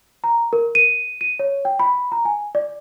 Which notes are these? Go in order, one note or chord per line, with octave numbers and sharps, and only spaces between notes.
A#5
A#4
D#7
D#7
C#5
G5
B5
A#5
G#5
D5